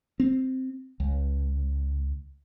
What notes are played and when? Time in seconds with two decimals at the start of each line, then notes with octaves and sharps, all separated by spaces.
0.20 C4
1.00 C#2